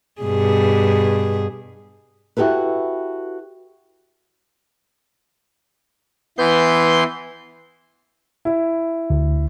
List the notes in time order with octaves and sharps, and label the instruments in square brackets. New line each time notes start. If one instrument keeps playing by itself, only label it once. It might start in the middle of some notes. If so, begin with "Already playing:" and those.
[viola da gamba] G2 B2 G#4
[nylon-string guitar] E4 F#4 G4 A4 B4
[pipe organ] E3 C6 G6 [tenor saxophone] B3
[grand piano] E4
[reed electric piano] D2